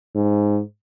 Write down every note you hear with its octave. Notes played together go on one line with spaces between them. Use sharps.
G#2